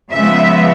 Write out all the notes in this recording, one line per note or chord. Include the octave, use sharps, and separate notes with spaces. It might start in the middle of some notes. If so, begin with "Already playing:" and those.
C#3 F3 G#3 B3 E5